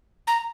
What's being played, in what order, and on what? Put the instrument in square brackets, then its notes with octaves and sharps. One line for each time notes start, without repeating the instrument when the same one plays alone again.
[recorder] A#5